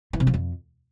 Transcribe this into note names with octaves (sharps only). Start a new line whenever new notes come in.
E3
C3
F3
F2